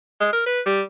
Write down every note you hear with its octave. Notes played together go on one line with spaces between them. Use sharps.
G#3
A#4
B4
G3